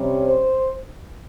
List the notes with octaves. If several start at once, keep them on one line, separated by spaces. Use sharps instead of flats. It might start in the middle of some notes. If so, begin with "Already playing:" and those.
Already playing: C3 G3 C#4
C5